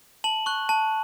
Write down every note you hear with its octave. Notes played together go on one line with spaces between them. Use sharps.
A5 F#7
C#6 F#6
A5